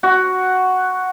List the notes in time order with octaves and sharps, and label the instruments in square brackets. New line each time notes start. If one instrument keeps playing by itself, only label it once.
[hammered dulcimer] F#4